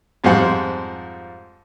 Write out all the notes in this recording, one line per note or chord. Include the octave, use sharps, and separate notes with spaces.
F2 G#2 F3 G3 C5 F#5